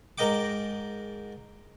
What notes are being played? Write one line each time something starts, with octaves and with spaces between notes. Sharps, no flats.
G#2 A#4 D#5 G5 D6